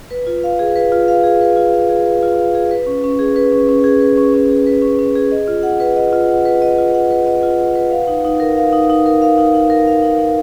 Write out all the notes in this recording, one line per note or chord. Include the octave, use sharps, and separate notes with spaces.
B4
F4
F5
G#4
B4
F4
F5
G#4
B4
F4
F5
G#4
B4
F4
F5
G#4
B4
C#4
C#4
G#4
B4
C#4
C#4
G#4
B4
C#4
C#4
G#4
B4
C#4
C#4
G#4
D#5
F4
F#5
B4
D#5
F4
F#5
B4
D#5
F4
F#5
B4
D#5
F4
F#5
B4
F5
D#4
D#4
A#4
F5
D#4
D#4
A#4
F5
D#4
D#4
A#4
F5
D#4
D#4